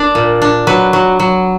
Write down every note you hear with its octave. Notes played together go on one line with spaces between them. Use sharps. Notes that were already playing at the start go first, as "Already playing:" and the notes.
Already playing: D4 D5
A#2
D4
F#3 B4
F#3
F#3